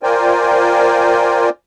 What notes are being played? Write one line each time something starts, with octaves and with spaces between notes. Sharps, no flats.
F4 A#4 C5 D5 G5 G#5